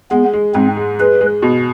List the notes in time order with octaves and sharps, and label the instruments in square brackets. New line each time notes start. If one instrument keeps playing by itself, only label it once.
[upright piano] G#3 [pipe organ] B3
[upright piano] G#3
[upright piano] G#2 [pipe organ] C4
[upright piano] G#3
[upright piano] G#3 [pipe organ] B4
[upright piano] G#3
B2